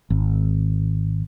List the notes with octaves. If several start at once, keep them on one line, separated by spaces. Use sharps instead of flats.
G#1